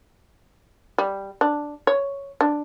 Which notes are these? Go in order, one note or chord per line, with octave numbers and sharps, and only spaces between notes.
G3
D4
C#5
D4